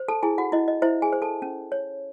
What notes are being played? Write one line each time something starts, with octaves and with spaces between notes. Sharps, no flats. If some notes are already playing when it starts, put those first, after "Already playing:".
Already playing: C5
A4 A5
E4 G#4 G#5
F#4 F#5
E4 D#5
D#5
E4 C5 E5
G#4 G#5
C5
A4 A5
C#4
C#5